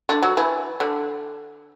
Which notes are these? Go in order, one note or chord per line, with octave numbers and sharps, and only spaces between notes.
D3 D4
F#3 F#4
E3 E4
D3 D4